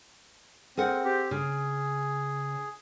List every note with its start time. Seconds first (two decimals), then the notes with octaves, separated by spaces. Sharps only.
0.77 C4 G#4 A#4 F#5
1.04 C4 G4
1.31 C#3 G#4